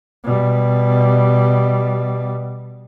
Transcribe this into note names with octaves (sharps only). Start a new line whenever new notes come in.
B2 G3